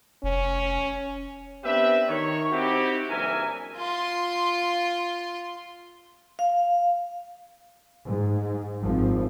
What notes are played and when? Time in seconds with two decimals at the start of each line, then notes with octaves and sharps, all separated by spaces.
0.23 F1 C#4
1.65 B3 C4 D4 G4 B4 E5
2.08 D#3 C#5
2.52 C4 D#4 E4 F#4 G4
3.10 F#1 G2 E3 A#4 E5 G#5
3.77 F4 C6
6.39 F5
8.06 G#2
8.81 G#1 F3